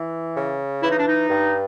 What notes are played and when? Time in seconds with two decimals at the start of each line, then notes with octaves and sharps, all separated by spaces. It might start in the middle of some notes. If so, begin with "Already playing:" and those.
Already playing: E3
0.36 C#3
0.83 E3 E4
0.91 D#4
0.99 D4
1.08 D#4
1.29 G2